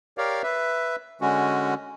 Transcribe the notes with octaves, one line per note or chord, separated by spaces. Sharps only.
G4 A#4 C#5 D5 F5
B4 E5
D3 G#3 C#4 F#4